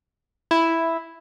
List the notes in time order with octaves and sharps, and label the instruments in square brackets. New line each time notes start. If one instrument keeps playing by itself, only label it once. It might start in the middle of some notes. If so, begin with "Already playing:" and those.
[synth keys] E4